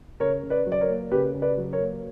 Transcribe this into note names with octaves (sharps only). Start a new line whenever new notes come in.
C#3 A#4 C#5
C#3
B4 D5
F#3
D5
A#4 C#5
A#3
C#3 G4 B4
C#3
B4 D5
F#3
A#4 C#5
A#3